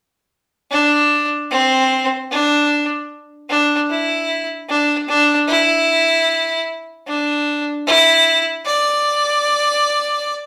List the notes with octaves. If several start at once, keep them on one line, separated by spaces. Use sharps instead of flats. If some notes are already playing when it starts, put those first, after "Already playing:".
D4
C4
D4
D4
E4
D4
D4
E4
D4
E4
D5